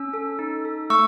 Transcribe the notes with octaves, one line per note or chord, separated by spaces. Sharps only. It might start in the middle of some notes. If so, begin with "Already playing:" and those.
Already playing: C#4 E6
A4
D#4
A4
A3 C#6 E6